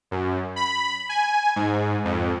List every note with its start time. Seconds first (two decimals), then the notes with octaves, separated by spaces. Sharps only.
0.11 F#2
0.56 B5
1.09 G#5
1.56 G#2
2.05 F2